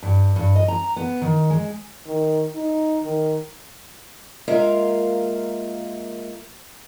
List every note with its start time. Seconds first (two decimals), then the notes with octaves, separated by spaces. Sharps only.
0.03 G2
0.36 G2
0.56 D#5
0.68 A#5
0.96 B3
1.22 D#3
1.50 G#3
2.06 D#3
2.55 D#4
3.03 D#3
4.48 G#3 A#3 F4 A#4 E5 F5